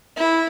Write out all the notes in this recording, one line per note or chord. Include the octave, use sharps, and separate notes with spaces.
E4